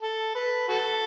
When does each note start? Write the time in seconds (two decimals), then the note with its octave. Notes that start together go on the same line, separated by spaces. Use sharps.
0.02 A4
0.35 B4
0.68 F#4 A4